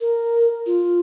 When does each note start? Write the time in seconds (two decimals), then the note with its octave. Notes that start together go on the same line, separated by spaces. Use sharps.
0.01 A#4
0.66 F4